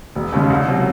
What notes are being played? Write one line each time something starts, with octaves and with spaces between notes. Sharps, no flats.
E1
D#2 C#3 G#3
C2
C3 F#3